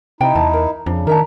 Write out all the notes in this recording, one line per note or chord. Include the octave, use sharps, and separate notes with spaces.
C3 D#4 E4 G5
E2 A5
A#4
F2 C#3 D4
D2 D#3 D4 A#4 E5 A5 A#5